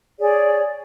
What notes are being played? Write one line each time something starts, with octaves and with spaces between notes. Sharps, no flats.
G#4 C#5 D5